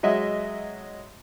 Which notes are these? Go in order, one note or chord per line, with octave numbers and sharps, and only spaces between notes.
F#3 G#3 D#5 E5